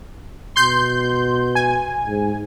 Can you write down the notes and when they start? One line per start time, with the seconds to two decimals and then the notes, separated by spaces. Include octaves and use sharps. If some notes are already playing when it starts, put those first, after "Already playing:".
0.56 B2 C6 G6
1.55 G#5
2.07 G#2